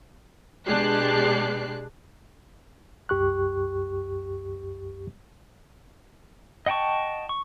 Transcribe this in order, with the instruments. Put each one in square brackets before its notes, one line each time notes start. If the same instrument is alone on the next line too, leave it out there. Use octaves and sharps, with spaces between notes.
[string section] B2 G#3 D4 G4 F#6 C7
[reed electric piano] C2 F#2 G4 C#6 F#6
[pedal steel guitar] D#5 F#5 G5 A5 C#6
C#6